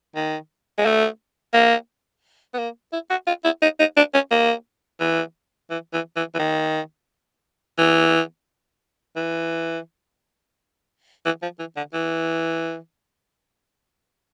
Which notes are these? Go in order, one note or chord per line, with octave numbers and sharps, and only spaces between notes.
D#3
G#3
A3
A#3
B3
A#3
E4
F#4
F4
E4
D#4
D#4
D4
C#4
A#3
E3
E3
E3
E3
E3
D#3
E3
E3
E3
F3
E3
D3
E3